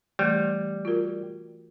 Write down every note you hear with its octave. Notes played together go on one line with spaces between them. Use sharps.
E3 G3 A3
F4 F#4 A#4